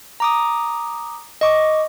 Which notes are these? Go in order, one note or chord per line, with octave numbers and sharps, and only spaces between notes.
A#5 D6 D#6
D#5 C#6 D6